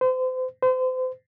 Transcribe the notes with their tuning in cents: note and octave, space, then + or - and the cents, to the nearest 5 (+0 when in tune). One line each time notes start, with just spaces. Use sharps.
C5 -35
C5 -35